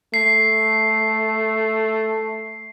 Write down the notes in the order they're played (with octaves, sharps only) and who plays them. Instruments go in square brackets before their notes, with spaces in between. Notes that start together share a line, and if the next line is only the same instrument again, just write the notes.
[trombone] A3 [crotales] C7